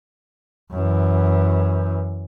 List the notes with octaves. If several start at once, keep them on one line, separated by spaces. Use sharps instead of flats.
F#2 E3